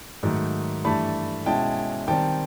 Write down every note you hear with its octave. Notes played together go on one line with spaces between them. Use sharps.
G#2 D#3 F#3 A3
G2 E3 A3 A5 B5
B2 G#3 C#4 E4 G5 A5
D#3 G3 C4 G5 A5